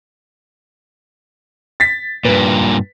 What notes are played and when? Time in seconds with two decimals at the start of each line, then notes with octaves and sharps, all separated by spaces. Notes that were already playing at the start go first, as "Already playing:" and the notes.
1.80 A6 B6
2.25 G2 A#2 B4